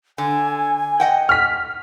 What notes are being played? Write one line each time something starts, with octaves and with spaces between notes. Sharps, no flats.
D3 G#5
D#5 F#5 G5
F6 B6